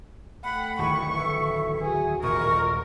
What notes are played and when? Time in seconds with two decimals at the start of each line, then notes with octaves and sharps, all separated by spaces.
0.44 A3 F#5 G5 B5
0.79 D1 D#3 E3 C#6
1.15 A4 B4 E5
1.82 F#4 G#4
2.23 D#1 F2 G#2 A#4 C#6